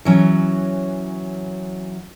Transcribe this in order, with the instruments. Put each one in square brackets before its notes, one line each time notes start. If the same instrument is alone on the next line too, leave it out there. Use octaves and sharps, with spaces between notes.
[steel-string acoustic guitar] E3 F#3 C#4